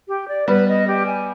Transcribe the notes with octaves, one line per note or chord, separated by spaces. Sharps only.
G4
D5
G3 B3 B4
D#5
G4
G#5